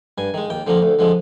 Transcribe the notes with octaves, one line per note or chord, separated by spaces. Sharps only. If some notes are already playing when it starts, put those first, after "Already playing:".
G2 G#5
D#3 G#3
D#2 G5
D3 F3 A#3
D2
D3 F3 G#3